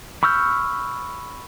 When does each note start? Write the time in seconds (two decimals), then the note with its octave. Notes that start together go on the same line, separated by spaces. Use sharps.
0.23 B5 C#6 E6 F6 G6